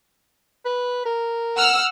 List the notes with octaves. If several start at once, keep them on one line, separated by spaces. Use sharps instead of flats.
B4
A#4
F#5 E6 F6